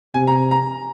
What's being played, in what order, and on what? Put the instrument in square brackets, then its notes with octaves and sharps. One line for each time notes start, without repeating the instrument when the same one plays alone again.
[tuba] C3 [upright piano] G#5
[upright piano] A#5
A#5